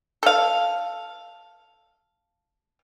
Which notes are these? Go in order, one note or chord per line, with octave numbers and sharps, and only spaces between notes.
A4 F5